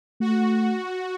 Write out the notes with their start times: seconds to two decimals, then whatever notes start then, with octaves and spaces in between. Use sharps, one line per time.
0.21 A3 F#4